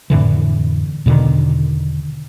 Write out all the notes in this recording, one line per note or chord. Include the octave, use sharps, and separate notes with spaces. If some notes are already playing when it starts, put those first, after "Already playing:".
F2 A2 D3 E3
E2 B2 D3 D#3